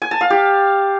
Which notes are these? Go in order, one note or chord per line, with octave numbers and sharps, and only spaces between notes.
G#5
A5
F5
G4